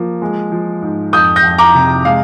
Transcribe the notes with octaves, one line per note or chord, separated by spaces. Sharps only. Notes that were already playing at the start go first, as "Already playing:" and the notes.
Already playing: F3 A#3
G#3
F3
G#2
F2 D#6 G6
G6 A#6
F2
A#5 D6
C3
G#3 F5